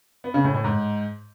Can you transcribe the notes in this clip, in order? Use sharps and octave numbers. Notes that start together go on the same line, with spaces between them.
B3
C#3
A2
A2
G#2